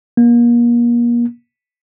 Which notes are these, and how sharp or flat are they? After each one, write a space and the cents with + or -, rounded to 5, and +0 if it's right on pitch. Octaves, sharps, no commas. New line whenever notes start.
A#3 +35